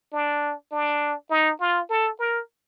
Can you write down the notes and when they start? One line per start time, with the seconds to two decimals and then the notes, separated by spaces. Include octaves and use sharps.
0.13 D4
0.72 D4
1.31 D#4
1.60 F4
1.90 A4
2.19 A#4